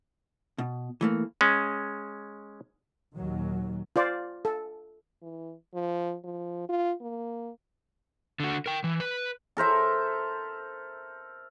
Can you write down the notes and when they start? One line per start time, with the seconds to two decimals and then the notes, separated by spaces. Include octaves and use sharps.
0.58 B2
1.01 E3 A3 A#3
1.41 G#3 C#4
3.16 D#2 A#2 D#3 F#3
3.96 F4 C5 D5
4.45 A4
5.22 E3
5.74 F3
6.24 F3
6.69 F4
7.01 A#3
8.40 D3 F#4
8.66 A#4 G5
8.84 E3
9.00 B4
9.57 A4 A#4 C5 E5